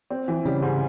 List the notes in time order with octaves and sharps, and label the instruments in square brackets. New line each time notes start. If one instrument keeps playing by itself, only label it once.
[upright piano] C4
E3
[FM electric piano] C#3 C#4 [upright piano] G3
[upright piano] G#2